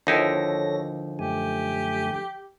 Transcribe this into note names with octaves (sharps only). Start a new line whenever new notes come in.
D#2 D3 F3 D#4 E4 A4 C#5 A#6
F#2 A3 G4 G#5